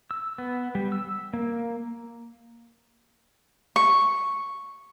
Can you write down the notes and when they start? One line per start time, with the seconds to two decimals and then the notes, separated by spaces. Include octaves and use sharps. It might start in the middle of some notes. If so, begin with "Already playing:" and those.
0.11 E6
0.38 B3
0.75 G3
0.92 E6
1.34 A#3
3.76 C#6